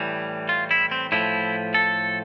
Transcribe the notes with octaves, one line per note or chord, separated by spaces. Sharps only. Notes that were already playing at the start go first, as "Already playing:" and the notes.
Already playing: A2 E3 G3
F4
E4
C4
A2 F3 E4
A4